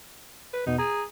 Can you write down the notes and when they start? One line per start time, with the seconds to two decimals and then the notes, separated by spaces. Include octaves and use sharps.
0.53 B4
0.66 E2 B2 B3 D#4
0.78 G#4 A#5